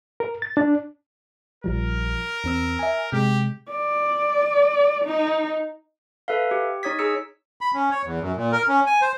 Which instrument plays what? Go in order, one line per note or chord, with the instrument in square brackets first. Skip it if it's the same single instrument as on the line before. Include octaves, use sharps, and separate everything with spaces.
[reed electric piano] A#4
A6
D4
[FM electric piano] A#1 F3 G3 [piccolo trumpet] A#4
[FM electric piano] E2 C4 E6
E5 G#5
[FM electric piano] C3 G#3 [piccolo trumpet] G4
[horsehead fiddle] D5
D#4
[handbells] A4 B4 E5 F5
G4
D#4 C#5 D#6 G#6 B6
D#4 G#4 E6 C#7
[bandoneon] B5
C#4
C#5
E2
F#2
A#2
A#4
C#4
G#5
C5